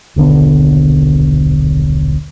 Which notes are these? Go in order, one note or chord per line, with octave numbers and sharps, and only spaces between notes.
D#1 B1 D3 B3